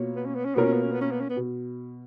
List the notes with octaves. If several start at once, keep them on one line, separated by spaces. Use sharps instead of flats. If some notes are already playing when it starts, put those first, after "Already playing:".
Already playing: B2 A#3 F4 A#4 C#5
B3
C#4
B3
C#4
B2 A#3 B3 F4 A#4 C#5
C#4
B3
C#4
B3
C#4
B3
C#4
B3
B2